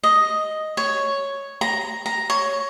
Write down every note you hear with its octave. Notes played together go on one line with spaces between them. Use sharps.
D#5
C#5
A#5
A#5
C#5